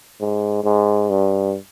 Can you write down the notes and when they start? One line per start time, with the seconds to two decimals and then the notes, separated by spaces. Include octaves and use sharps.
0.20 G#2
0.64 G#2
1.09 G2